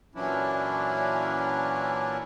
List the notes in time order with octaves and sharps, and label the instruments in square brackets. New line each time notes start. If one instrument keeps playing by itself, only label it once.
[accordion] A#2 E3 F#3 C#4 D4 E4